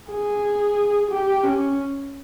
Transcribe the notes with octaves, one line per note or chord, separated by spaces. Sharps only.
G#4
G4
C#4